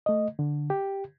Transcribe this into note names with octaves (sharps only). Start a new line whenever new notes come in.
A3 D#5
D3
G4